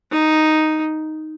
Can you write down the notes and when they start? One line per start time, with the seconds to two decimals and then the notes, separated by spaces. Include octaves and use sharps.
0.11 D#4